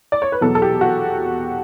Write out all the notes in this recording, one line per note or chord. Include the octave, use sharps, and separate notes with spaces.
D5
C#5
B4
E2 B2 F#3 A4
A4
G4
F#4